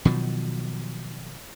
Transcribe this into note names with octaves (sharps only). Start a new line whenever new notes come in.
B2 D#3 F3 F#3